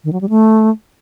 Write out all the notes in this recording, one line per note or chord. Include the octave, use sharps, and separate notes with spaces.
D#3
F#3
G3
A3